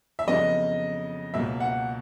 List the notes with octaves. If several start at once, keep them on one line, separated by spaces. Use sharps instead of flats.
E5
F2 C#3 F#3 B3 D#5
C#2 B2 F#3 A#3 E5
F#5